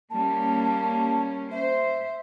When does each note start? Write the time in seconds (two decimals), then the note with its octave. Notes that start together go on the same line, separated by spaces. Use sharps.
0.10 G3 A#3 C#4 A5
1.51 C5 E5